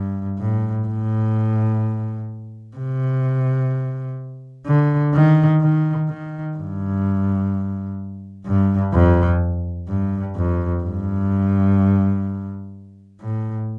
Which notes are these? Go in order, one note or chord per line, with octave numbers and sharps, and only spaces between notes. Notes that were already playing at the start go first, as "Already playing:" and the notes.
Already playing: G2
A2
A2
C3
D3
D#3
D#3
D#3
G2
G2
F2
G2
F2
G2
A2